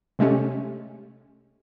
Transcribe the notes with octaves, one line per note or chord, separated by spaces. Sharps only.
C3 G#3 A3 C#4 G4